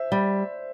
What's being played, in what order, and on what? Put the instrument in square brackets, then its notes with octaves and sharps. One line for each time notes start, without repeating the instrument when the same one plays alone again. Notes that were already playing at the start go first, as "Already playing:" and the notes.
Already playing: [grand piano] C5 E5
[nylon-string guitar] G3